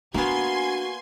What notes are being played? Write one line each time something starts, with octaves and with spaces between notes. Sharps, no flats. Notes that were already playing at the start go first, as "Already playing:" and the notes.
A#3 B3 D4 F#4 G#5 C6 G#6